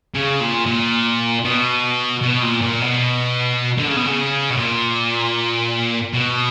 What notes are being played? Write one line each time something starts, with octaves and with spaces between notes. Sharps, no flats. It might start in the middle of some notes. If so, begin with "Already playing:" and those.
C#3
A#2
A#2
B2
B2
A#2
A#2
B2
D3
C#3
B2
C#3
B2
A#2
B2